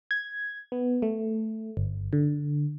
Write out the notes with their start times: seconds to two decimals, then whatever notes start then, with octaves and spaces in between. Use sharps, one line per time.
0.11 G#6
0.72 B3
1.02 A3
1.77 G1
2.13 D3